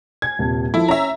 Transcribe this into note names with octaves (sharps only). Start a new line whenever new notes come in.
G#5 G#6
D#1 C3 A5
F3 E4 A4
C#4 E5 A#5